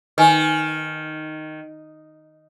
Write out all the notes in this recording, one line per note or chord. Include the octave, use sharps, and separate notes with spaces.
D#3 B4 G#5